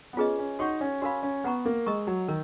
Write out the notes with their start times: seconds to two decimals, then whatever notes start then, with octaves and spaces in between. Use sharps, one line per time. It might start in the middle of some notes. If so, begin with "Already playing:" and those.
0.13 B3
0.17 C#4 F4 G#4 B4 D#5
0.38 C#4
0.59 D#4 F#4 C#5 F#5 C#6
0.81 C#4
1.02 C#4 F#4 A#4 F5 B5
1.23 C#4
1.44 B3 B4 F#5 A#5 C#6
1.66 A#3
1.86 G#3 A#4 D#5 A#5 C#6
2.07 F#3
2.28 D#3 A#4